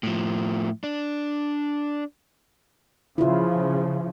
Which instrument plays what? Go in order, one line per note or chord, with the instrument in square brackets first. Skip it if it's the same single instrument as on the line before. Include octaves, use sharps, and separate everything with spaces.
[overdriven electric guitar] A2 F3
D4
[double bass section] C#3 F3 [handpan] E4 F4